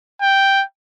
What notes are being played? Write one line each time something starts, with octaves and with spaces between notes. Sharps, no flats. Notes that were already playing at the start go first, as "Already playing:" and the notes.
G5